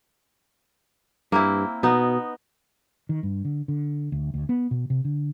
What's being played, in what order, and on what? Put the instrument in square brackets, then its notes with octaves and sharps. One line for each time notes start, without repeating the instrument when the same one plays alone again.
[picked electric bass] G2 [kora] A#3 C4 E4
[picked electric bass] B2 [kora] B3 D#4
[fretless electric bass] D#3
G2
D3
D3
D2
D2
B3
B2
C3
D3